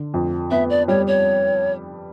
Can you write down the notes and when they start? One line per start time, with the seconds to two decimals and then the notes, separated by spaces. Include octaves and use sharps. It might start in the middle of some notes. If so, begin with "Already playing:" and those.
Already playing: D3
0.14 F2
0.51 B3 E5
0.70 D5
0.88 G3 C#5
1.07 C#5